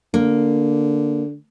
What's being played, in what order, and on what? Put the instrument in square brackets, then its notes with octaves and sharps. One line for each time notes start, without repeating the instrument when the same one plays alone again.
[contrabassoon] D3 [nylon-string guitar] A#3